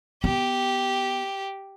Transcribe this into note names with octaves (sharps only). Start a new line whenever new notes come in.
B3 G4